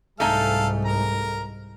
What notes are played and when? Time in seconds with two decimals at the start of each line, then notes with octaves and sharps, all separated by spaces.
0.20 C2 G#2 A3 D#4 A4 F5 G#5
0.85 A#4 A#5